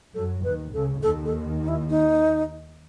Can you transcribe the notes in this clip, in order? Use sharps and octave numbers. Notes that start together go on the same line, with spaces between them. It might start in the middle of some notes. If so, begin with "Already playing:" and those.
F#2 F#3 A4
D#2 D#3 B4
C#2 C#3 A4
D#2 D#3 A4
A4
D#4
E4
D#4